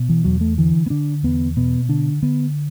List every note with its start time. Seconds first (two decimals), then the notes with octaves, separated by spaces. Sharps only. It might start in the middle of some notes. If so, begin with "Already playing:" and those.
Already playing: B2
0.09 E3
0.24 E2 F#3
0.41 A3
0.58 D3 E3
0.86 B3
0.90 D3 D4
1.23 E2 B3
1.57 B2 B3
1.89 D3 D4
2.22 D3 B3